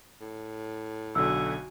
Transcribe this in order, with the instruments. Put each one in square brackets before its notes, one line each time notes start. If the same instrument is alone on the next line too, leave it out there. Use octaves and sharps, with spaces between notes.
[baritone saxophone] A2
[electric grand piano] B1 D3 [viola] F#4 G#5 [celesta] E6